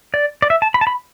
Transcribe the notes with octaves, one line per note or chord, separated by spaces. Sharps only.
D5
D5
E5
A5
B5
A5
B5